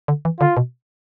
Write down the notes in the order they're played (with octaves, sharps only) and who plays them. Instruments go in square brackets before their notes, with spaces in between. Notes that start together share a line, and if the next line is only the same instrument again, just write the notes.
[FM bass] D3
E3
[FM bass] D3 [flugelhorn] F4
[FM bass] B2